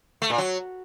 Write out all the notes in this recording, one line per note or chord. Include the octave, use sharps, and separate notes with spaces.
A3
A#2
F#3